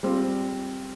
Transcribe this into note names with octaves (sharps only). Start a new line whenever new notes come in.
G3 C4 F4